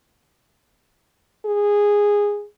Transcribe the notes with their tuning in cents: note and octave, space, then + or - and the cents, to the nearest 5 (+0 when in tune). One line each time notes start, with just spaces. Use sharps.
G#4 -10